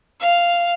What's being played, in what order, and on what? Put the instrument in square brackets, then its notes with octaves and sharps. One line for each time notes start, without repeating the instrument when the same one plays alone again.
[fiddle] F5